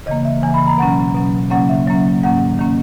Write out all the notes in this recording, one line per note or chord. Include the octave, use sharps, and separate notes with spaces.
C#3 E3 A#3 D#5
E5
C#3 E3 A#3 G#5
B5
A#5
B2 F#3 C#4 F#5
B2 F#3 C#4
C#3 F#3 A#3 C#4 F#5
E5
C#3 F#3 A#3 C#4
G#2 D#3 A#3 C#4 F#5
D#3 A#3 C#4